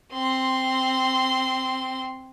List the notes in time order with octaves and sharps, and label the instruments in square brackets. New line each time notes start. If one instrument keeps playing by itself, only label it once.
[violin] C4 C6